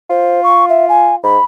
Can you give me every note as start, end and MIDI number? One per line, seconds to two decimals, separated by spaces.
0.10 1.17 65
0.10 0.40 72
0.44 0.65 85
0.69 0.86 76
0.89 1.15 80
1.24 1.38 44
1.24 1.44 83